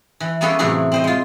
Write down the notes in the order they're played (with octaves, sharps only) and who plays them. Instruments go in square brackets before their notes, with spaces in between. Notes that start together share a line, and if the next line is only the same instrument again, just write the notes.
[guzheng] E3
A#3 B3 C#4 G#4 A4 B4
A2 C3 E3 F#3 F#4 G#4
C4 C5 D#5
G#3 F4